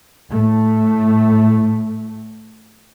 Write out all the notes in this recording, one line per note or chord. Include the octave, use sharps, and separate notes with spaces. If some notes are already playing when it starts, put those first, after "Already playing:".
A2 A3